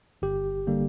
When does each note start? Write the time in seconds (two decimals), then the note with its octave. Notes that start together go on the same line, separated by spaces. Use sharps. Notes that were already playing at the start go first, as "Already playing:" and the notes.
0.22 G1 G4
0.67 D3 G3 A#3